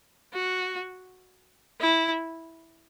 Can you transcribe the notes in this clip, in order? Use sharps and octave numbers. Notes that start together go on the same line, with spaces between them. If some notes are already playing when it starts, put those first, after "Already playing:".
F#4
E4